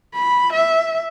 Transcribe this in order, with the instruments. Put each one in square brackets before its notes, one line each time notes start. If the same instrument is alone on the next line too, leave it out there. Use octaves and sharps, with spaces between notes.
[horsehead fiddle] B5
E5